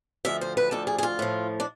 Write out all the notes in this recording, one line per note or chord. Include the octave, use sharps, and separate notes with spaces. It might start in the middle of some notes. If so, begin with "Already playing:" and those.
D2 D3 F3 E5
C5
B4
D2 D3 F3 A4
G#4
G#4
F4
A2 F3
D4